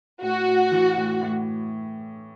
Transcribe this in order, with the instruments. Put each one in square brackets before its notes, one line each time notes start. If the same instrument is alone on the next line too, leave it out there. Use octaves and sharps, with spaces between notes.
[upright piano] A2 [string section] F#4
[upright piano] A2
E3
A2
A2